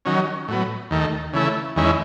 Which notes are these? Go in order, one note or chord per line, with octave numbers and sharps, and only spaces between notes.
D#3 F#3 C#4
A2 F#3 B3
D#2 D#3 A3
C#3 E3 A3 E4
E2 D#3 G#3 C#4 E4